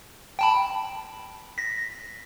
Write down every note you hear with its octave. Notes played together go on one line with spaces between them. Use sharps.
G5 A5 B5
A#6 B6